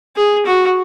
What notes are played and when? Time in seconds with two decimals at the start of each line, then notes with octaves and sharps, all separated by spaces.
0.16 G#4
0.46 F#4